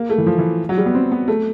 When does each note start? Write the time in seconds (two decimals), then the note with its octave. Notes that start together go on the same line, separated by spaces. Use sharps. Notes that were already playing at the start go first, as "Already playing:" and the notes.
Already playing: A#3
0.10 A3
0.18 E3
0.26 F3
0.38 E3
0.69 F#3
0.78 G3
0.86 B3
0.95 C4
1.12 B3
1.28 A3